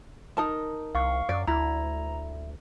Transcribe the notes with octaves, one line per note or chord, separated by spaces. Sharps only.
D#4 A#4 A5
C2 F5 C#6
F#2 D5
D2 E4 A#5